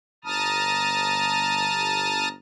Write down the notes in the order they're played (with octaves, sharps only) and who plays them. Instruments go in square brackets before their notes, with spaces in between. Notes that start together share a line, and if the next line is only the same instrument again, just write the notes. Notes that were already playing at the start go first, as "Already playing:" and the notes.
[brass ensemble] G1 A#5 [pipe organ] A5 D#6 F6